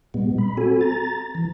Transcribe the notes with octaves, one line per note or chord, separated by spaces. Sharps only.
A#2 G3 G#3 B3
B5
C4 F#4 A4 G#5
A#5 A6
E3